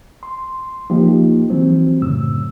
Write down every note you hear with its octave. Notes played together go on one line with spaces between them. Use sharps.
C6
F3 A#3 D#4 G4
E3 F#3 C4
F#2 A2 C#3 E6